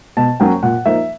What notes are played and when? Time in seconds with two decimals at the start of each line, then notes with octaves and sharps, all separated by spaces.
0.17 B2 A5
0.40 F#3 A#3 C#4 G5
0.63 A#2 F#5
0.86 F3 A#3 D#4 E5